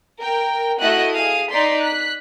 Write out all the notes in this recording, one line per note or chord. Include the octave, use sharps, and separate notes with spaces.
A#4 G5
A3 E4 F#4 D#5 F#6
G#4 F5 D#6
D#4 D5 C6 B6
F#6 B6